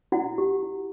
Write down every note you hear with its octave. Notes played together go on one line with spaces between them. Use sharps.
E4 F#4 F#5
G4
E4